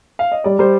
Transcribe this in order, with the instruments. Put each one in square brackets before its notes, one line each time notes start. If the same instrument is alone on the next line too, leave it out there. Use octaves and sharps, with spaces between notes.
[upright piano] F5
D#5
[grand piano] G3 [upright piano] D5
[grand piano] G3 [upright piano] C5